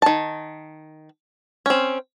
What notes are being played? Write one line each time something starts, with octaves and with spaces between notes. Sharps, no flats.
D#3 A5
C4 C#4